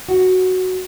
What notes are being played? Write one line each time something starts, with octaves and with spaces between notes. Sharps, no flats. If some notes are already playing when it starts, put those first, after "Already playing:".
F#4